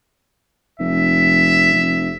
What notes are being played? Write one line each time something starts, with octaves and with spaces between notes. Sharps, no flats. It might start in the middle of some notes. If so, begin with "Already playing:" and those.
F1 E5
F1